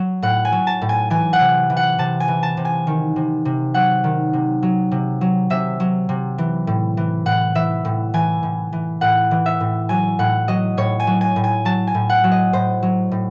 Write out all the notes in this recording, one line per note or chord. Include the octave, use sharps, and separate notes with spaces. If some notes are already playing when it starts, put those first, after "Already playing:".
Already playing: F#3
A2 F#5
G#5
F#3
A5
A2
G#5
E3 G#5
F#5
C3
E3
F#5
C3 A5
G#5
E3
A5
C3
G#5
D#3
C3
C3
F#3 F#5
D#3
C3
F#3
C3
F#3
C3 E5
F#3
C3
E3
A2
E3
A2 F#5
E3 E5
A2
E3 G#5
A2
E3
A2 F#5
E3
E5
A2
F#3 G#5
A2 F#5
F#3 D#5
A2 C#5
G#5
F#3
G#5
A2
G#5
F#3 A5
G#5
A2
F#5
F#3
D#5
A2 C5
F#3
A2